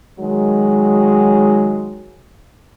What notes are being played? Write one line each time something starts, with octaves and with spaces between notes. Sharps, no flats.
D#3 F#3 G#3